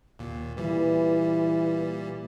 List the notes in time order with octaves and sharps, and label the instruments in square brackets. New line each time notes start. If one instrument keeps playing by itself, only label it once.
[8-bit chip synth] D#2 A#2 [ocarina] A#3
[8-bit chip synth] A#2 G3 [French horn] E3 [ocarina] B4
[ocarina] A#3